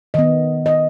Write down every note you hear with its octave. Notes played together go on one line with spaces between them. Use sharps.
D#3 B3 D#5
D#5